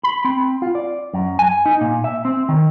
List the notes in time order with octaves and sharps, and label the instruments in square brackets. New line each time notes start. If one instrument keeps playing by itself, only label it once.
[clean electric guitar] B5
C4
F4
D5
F#2
G#5
D#4
A#2
E5
C4
D#3